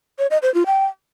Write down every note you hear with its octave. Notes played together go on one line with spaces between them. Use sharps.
C#5
D#5
C5
F4
G5